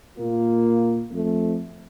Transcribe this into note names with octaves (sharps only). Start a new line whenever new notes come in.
A#2 A#3 F4
F2 A3